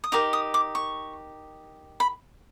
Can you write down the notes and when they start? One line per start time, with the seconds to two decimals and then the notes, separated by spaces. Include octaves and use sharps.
0.04 D#6
0.12 D#4 G4 A#4 D6
0.33 D#6
0.54 D6
0.75 C#6
2.00 B5